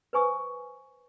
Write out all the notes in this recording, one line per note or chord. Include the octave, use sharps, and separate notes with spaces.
B4 C5 G#5 C#6 D#6